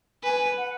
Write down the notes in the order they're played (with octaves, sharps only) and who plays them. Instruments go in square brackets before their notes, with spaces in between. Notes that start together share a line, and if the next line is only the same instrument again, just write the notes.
[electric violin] B4 [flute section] G#5
[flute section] F#5